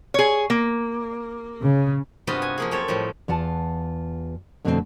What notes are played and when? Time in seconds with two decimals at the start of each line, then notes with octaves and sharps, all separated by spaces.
0.14 G#4 C#5
0.50 A#3
1.64 C#3
2.27 G2 C3 B3 F4 F#4 D#5
2.42 G#5
2.58 F3 A#3 G#4
2.71 F#2 C4 A4 C#5
2.88 A2 F3 G3
3.28 E2 F4 F#5 A5
4.65 F2 B2 D3 A3 B3 C4